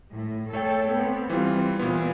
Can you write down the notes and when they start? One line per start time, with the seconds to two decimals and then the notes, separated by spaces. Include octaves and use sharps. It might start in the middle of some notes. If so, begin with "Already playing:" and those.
0.12 A2
0.53 A3 A4 C#5 G5
0.90 B3 C4
1.30 E3 G3 C4 F4
1.79 A#2 E3 B3